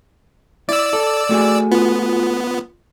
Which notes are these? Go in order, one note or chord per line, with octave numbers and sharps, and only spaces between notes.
E4 D5 E6
A4
A3 F#4 G#4
B3 F4